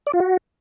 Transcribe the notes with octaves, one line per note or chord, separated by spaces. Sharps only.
D5
F4
F#4